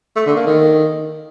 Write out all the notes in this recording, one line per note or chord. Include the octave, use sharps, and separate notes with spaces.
A3
D3
A#3
D#3